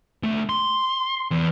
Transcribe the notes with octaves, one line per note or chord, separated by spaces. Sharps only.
D3 A3
C6
E2